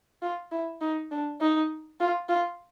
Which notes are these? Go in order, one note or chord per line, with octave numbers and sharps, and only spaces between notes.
F4
E4
D#4
D4
D#4
F4
F4